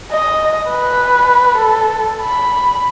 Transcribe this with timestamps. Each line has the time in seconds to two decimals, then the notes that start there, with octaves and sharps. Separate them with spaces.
0.12 D#5
0.70 B4
1.58 A4
2.22 B5